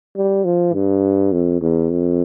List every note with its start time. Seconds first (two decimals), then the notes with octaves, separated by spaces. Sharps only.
0.16 G3
0.44 F3
0.73 G2
1.33 F2
1.61 E2
1.90 F2